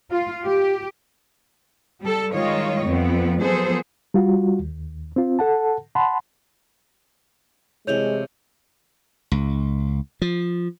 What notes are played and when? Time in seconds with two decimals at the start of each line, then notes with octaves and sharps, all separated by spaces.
0.11 F4
0.45 G4
2.01 G3 A4
2.33 D#3 G3 G#3 F4 C#5 D#5
2.87 F2 B3 C4
3.39 F3 F#3 B3 G#4 A4 C5
4.14 G3 F4 F#4
4.59 D#2
5.16 C4 F4
5.39 A4 F#5 A5
5.95 F#5 A5 B5 C6
7.87 C3 E3 G#3 A3 C#5 G6 F7
9.32 C#2
10.22 F3